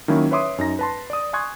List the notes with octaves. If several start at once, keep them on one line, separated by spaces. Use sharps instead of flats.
D#3 F#3 A#3 C#4 E4
B4 C#5 E5 C6 D6 D#6
F#2 D#4 A#6
B4 A5 C6
D5 D#6
G#5 C6 C#6 D#6 F#6 G#6